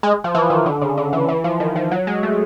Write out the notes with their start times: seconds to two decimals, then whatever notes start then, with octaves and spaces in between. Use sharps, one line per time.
0.03 G#3
0.24 F3
0.35 E3
0.50 D#3
0.66 D3
0.81 C#3
0.97 D3
1.13 E3
1.29 E3
1.44 F3
1.60 D#3
1.76 F3
1.91 F#3
2.07 G#3
2.23 A3